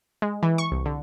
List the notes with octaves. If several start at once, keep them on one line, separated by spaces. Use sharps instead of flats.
G#3
E3
C#6
C2
D3